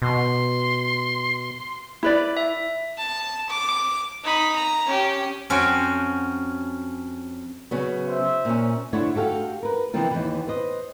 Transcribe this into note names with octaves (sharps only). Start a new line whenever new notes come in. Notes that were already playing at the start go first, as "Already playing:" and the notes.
B2 C6
E4 B4 D5
E5
A5
D6
D#4 B5
A#5
C#4 G4
F2 C#4 F#4 C5 G5
C#3 F#3 B3
C5 E5
A#2 C#4
D3 A3 D4 E4 C5 C#5
F#4 G4 A4 F5
A#4 B4
C3 E3 F3 A#3 C4 F4
D#2 E3
B4 C5 D#5